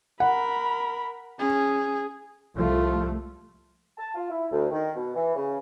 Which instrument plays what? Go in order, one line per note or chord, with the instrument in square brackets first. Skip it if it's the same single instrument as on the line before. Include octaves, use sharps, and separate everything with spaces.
[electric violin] A#4 B5 [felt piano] F#5
[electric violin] C#4 [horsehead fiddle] G#4
[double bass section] C2 F3 A3 [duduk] F4
[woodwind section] A5
F4
E4
D2
D#3
B2
E3
C#3